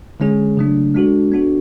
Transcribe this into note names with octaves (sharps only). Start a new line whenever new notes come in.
D3 G#3 C#4 G#4
C#3 F#3 A3 D4
G#3 D4 F#4 A4
B3 D4 F#4 A4